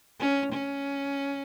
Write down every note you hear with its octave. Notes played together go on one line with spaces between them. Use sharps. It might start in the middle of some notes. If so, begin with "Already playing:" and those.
C#4
C#4